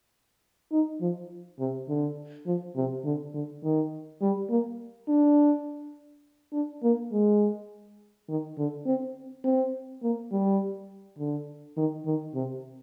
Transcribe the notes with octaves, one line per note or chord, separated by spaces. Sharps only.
D#4
F3
C3
D3
F3
C3
D3
D3
D#3
G3
A#3
D4
D4
A#3
G#3
D#3
D3
C4
C4
A#3
G3
D3
D#3
D#3
C3